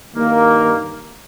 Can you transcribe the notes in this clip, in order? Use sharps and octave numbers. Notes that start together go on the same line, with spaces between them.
G2 D#3 A#3